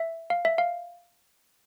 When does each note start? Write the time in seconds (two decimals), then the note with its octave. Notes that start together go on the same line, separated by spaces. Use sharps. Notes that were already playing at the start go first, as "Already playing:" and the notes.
Already playing: E5
0.30 F5
0.45 E5
0.58 F5